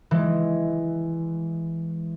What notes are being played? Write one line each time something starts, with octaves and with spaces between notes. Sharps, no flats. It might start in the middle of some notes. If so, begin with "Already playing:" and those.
E3 G#3